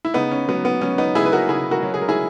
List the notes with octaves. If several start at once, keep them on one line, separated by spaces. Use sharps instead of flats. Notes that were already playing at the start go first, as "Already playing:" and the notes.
E4
C#3 B3 D#4
C#4
F#3 B3
B3
F#3 C#4
B3 D#4
C#3 E4 G#4
B4
F#4 A#4
C#3 E4 G#4
F#4 A#4
F#3
G#4
A#4
E4 G#4